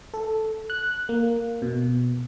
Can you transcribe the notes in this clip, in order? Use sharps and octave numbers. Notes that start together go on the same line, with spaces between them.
A4
F#6
A#3
B2